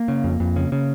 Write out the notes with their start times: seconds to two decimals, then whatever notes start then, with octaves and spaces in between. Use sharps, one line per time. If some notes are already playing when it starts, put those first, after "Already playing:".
Already playing: A#3
0.08 C#3
0.24 F2
0.40 F2
0.56 C#3
0.72 C#3